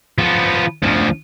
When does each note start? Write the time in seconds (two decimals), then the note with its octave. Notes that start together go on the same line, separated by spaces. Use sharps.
0.18 F3 B3
0.83 D2 F3